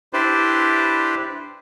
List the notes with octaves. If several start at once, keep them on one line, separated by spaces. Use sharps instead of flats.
D4 E4 G4 B4 C5 D5